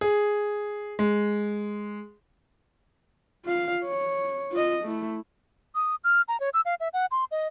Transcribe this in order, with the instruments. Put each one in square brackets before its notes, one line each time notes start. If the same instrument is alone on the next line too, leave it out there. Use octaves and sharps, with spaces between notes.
[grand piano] G#4
G#3
[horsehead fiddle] F4 F5
C#5
F4 D#5
A3 E4
[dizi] D#6
F6
A#5
C#5
E6
F5
E5
F#5
C6
D#5